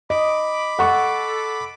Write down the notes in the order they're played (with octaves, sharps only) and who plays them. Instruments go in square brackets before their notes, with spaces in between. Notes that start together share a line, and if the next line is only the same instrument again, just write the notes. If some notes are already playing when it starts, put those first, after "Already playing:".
[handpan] D#5 [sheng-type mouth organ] B5 D6
[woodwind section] A4 [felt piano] F#5 C#6